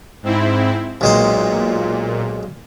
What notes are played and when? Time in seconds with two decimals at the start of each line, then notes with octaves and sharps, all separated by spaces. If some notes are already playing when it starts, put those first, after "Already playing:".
0.23 G#2 C4 E4
1.01 B1 A#2 G#3 C5